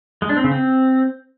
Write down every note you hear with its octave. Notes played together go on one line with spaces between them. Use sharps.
G#3
D4
C4
C#3
C4